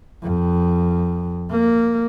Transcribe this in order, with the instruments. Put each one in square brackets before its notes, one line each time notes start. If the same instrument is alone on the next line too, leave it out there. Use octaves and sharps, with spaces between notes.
[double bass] F2
A#3